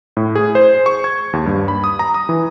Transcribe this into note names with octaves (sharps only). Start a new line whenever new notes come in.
A2
G#4
C5
C#6
G#6
D#2
G2
B5
D#6
A#5
D#6
E3